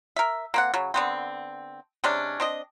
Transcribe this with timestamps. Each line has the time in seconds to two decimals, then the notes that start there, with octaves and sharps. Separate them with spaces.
0.16 A#4 E5
0.54 A#3 C4 F#5
0.74 C#3 F#3
0.94 D3 B3 C4
2.04 C3 G#3 C#4 D4
2.40 C4 D4 D#5